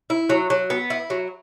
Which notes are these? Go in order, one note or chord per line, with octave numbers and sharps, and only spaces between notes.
E4
F#3
F#3
B3
E4
F#3